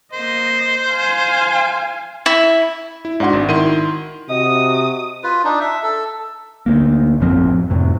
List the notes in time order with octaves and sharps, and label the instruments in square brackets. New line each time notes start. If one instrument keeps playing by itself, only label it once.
[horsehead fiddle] A#3 D#5 [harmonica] C5
[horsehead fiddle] F5 G#5
[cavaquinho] E4
[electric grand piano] E4
[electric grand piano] G#2 C6 [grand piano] D4 F#4
[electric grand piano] G#1
[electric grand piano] D#3 E4 C6 [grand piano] D#7
[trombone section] C3 F#4 [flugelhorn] D#5 [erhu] D#6
[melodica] F4 B4
D4 D#4
E5
A4
[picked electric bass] D2 A#3
A1 F#2 F3 C4
F2 A2 C3